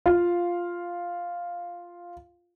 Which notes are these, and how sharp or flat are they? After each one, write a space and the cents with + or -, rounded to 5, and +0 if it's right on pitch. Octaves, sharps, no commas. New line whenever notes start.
F4 +0 F5 +0